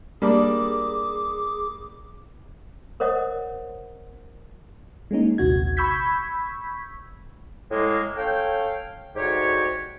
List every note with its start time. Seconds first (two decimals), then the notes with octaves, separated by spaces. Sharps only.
0.22 G3 A#3 D4 G#4 D6
3.00 A#4 C5 C#5 D#5 F#5 D#6
5.11 G#3 A#3 C#4 D#4
5.38 A#1 D#2 C3 F#4 G#6
5.77 B5 C#6 E6 G6 G#6 B6
7.71 A2 G#3 A#3
8.17 C#4 A4 C#5 F5 G5
9.16 D2 G#2 F#4 G4 C#5